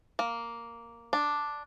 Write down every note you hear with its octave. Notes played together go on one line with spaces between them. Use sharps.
A#3
D4